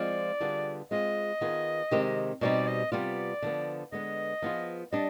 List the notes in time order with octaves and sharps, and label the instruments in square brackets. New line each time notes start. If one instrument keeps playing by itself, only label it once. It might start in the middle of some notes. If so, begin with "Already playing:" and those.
Already playing: [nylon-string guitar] F3 G#3 C4 F4 [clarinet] D5
[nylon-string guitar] D3 G3 B3 F4 G#4
[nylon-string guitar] G#3 C4 F4 G#4 [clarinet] D#5
[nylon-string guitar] D#3 B3 F4 G#4
C3 D#3 G#3 C4 G4
[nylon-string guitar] B2 G3 C4 D#4 G4 [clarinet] D5
[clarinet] D#5
[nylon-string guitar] C3 G3 B3 F4 [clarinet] D5
[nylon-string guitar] D3 F3 B3
[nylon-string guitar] D3 G#3 B3 [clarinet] D#5
[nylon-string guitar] F3 B3 D4 F4 G#4
[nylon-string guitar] G3 D4 [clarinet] D#5